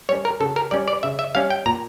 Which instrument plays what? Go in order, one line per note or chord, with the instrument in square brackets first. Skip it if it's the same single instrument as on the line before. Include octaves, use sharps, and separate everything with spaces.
[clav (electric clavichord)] G3 C#4 C#5
A#4
C#3 A4
A#4
G3 C#4 D5
D5
C#3 E5
E5
G3 C#4 F5
G5
A#2 A#5